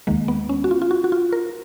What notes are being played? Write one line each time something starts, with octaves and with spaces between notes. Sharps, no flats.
D#2 D#3 G#3 A#3
B3
C#4
F#4
F4
F4
F#4
F#4
F4
A#4